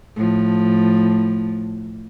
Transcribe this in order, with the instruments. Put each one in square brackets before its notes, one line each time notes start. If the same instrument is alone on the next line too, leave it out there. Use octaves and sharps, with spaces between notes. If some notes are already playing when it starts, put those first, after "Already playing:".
[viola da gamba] A2 F3